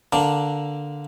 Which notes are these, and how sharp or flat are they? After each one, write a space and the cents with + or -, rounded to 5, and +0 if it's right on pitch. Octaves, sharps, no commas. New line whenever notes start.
D3 +0 A#3 +5 D4 +0